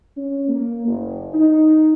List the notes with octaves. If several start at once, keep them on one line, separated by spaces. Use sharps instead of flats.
C#4
A#3
F#1
D#4